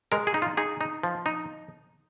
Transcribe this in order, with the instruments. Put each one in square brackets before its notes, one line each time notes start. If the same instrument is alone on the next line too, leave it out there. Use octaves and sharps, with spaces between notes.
[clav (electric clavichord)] G#3 A#4
G#4
D#4
F4
D#4 G#4
D#4
F3
D#4